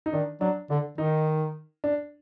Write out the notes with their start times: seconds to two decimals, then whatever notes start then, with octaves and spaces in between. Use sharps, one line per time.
0.06 D#4
0.13 D#3 D4
0.41 F#3 D4
0.70 D3 D4
0.98 D#3 D#4
1.84 D4